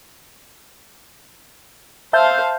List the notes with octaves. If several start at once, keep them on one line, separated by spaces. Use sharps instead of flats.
C5 E5 F5 A5 G6